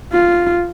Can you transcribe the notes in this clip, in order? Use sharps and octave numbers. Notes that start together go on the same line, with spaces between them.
F4